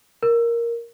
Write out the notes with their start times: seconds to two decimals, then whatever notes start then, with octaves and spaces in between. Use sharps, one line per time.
0.23 A#4